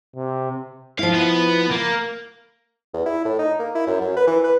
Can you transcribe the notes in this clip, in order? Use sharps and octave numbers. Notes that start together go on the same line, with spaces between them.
C3
F3 E4 F5
B3 B4
A#3
E2
E4
A2
D#4
A#3
E4
F#2
F#2
B4
E3
B4